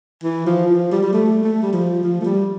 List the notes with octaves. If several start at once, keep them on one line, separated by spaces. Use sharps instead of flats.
E3
F3
F3
G3
G3
A3
A3
G3
F3
F3
A3
G3